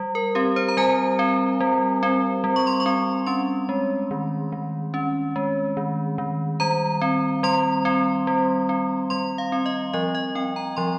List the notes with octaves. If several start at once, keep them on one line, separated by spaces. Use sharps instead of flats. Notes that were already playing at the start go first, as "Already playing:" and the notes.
Already playing: G3
A#4
C4 G4
C5
A#5
G3 G#5
C4
G3
C4
G3
C#6
C6
C#6
C4
C#4 C6
G#3
D#3
D#3
C#4
G#3
D#3
D#3
G3 A#5
C4
G3 C6
C4
G3
C4
G3 C6
F5
C4
D#5
F3 D#5
D#5
C4 G5
A#5
F3 C6